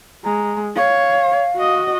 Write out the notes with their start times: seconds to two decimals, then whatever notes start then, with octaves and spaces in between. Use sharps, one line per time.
0.24 G#3 A#5
0.76 C#5 F5
1.56 F#4 D#5